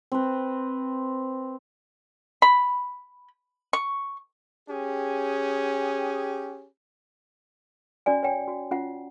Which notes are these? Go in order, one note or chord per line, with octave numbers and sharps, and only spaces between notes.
C4 B4
B5
C#6
C#4 G4 G#4
C#4 F#4 D5 G#5
C#5 G5 G#5
F#4
C#4 F4 F#5